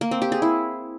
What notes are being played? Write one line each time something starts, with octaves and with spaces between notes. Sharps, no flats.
A#3
C4
G4
G#4
E4